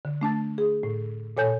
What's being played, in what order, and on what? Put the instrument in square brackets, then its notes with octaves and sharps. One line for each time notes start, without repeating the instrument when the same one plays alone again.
[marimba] D3
A3 D4 A5 A6
G#4
A2
A#2 A4 C#5 G#5 G6